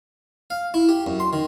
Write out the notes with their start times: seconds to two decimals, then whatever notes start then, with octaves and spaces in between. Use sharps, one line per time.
0.50 F5
0.74 E4
0.89 G4
1.07 F#2
1.20 C6
1.33 D#3